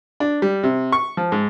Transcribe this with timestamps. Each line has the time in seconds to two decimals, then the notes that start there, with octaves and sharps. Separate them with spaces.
0.20 D4
0.42 G3
0.64 C3
0.92 C#6
1.17 F3
1.32 G#2